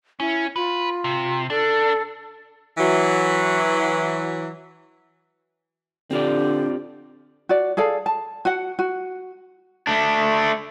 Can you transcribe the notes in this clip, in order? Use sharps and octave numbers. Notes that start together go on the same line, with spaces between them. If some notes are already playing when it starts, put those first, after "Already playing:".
C#4 E4
F4 B4
C3
D4 A4
E3 F#3
D3 C4 D4 F4 G4 D5
F#4 D5
G#4 A4 D5 F5
A5
F#4 F#5
F#4
A3 D4